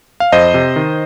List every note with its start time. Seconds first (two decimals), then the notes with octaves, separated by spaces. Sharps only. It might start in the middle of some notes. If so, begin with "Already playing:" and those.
0.20 F5
0.32 F2 C5 D#5
0.54 C3
0.76 D#3